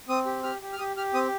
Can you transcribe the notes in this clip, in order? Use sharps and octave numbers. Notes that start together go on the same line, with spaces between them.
C4 D#6
G4
G4 F6
G4
F6
G4 D#6
G4 F6
C4 D#6